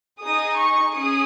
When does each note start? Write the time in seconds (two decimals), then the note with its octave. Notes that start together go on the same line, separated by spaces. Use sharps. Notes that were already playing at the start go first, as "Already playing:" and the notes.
0.22 D#4 G#4 D#6
0.58 C#6
0.94 C#4 G#4 D#6